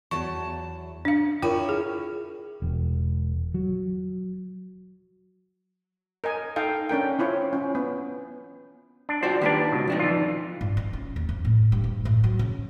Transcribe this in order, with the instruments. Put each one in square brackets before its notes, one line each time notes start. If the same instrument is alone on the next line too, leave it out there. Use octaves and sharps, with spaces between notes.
[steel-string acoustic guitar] E2 F#3 A5 [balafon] C#6
[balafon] D4 F5
[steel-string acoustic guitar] E4 A#4 C#5 [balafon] F4 G5
[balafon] G#4
[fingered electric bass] E1
F#3
[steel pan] A#4 D#5 G#5
D#4 A4 F5 G5
C#4 D4 A#4 G5
C4 E4 F4 C#5
C#4
B3
[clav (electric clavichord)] D4
[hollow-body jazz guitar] F4 F#4 D5 [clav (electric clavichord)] C5
[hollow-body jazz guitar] D#3 A#3 B4 [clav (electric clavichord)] D4 G4
[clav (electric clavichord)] C#2 B2
[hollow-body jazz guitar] F2 D4 D#4
[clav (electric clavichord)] E3 F4
[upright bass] G2
F4
C#4
D#2
F2
A2
G2
D2
A2
F#3
C#3